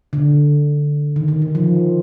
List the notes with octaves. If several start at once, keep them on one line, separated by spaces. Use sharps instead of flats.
D3
D#3
D#3
D#3
F3